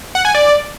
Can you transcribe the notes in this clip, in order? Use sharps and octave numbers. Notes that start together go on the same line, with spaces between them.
F#5
G#5
D5